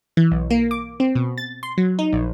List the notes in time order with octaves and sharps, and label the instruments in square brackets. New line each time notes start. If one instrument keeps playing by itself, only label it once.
[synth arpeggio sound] E3
B1
A#3
D6
C4
B2
A6
C6
F#3
D#4
A#1